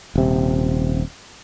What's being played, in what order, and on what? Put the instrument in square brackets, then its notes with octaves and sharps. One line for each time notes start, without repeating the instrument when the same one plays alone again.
[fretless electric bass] D#1 C3